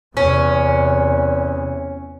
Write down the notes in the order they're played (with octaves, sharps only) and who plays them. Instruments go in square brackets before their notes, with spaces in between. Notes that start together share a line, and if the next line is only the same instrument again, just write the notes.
[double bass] E2 C3 [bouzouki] C#4